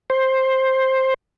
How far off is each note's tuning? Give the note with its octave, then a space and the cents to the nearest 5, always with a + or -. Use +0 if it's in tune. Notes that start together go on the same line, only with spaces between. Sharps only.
C5 +10